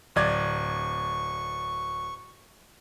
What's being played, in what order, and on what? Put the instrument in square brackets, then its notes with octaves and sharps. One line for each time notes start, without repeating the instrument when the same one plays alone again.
[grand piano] D1 D5 G#6 [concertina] C#6